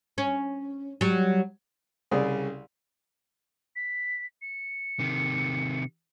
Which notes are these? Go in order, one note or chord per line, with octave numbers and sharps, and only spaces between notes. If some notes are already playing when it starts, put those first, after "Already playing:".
C#4
F#3 G3
C2 C#3 G#4 D5
B6
C#7
C3 D#3